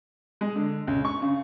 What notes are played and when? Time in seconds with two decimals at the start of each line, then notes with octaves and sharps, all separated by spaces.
0.41 G#3
0.56 D3
0.87 C#2
1.05 C#6
1.22 C#3